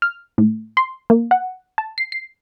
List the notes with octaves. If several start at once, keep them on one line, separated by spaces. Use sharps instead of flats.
F6
A2
C6
A#3
F#5
A5
C7
C7